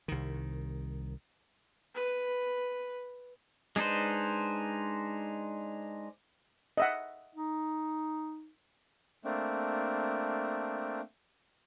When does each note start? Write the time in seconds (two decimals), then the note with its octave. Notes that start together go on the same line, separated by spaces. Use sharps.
0.08 C2 D#3
1.95 B4
3.76 G#3 D4 D#4 B4 C5
6.77 D#5 E5 F#5
7.35 D#4
9.25 A3 A#3 C4 D4